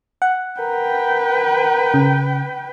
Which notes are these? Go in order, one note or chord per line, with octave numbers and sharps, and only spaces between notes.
F#5
A#4 B4 G5
C#3